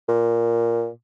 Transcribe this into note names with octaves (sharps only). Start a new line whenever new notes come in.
A#2